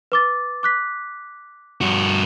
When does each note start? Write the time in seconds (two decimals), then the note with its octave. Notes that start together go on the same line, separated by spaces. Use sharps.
0.12 B4 D6 A6
0.63 D6 F#6 B6
1.81 G2 F#4